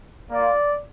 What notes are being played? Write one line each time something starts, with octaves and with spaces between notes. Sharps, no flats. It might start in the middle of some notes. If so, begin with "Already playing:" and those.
A#3 F4 D5